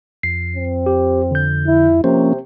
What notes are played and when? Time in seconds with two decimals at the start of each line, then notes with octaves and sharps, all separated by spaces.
0.23 F2 C7
0.56 C4
0.86 G4
1.31 D3 G6
1.67 E4
2.04 C3 F3 A#3 C#4 C5